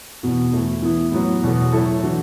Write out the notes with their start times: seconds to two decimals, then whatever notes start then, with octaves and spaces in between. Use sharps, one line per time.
0.23 E2 B2 B3 F#4
0.53 E2 E3 A3 E4 A4
0.82 E3 B3 E4
1.12 A2 F#3 B3 F#4
1.43 E2 B2 B3 F#4 A4
1.72 A2 F#3 A3 E4 A4
2.02 E3 D4 F#4